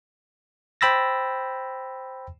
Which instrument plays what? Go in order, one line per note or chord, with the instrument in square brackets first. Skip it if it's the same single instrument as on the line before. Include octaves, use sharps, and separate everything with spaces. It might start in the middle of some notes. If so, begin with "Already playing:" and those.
[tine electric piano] C5 G5 B5 E6 A6 A#6